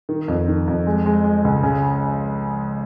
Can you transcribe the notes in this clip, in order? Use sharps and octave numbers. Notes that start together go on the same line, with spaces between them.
D#3
F2
D#3
F2
G#3
G#3
G#3
C#2
C#3